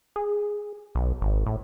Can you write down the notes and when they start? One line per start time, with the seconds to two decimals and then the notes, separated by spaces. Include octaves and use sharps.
0.16 G#4
0.95 B1
1.21 G#1
1.46 A2